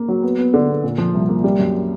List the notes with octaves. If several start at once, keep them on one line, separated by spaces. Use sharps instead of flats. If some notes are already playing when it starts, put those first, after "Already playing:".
Already playing: A#3
F#3
B3
B3
D3
B3
A#2
F3
C2
A#3
G3
F#2